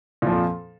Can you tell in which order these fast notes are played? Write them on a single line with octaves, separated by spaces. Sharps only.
A#2 F3 F2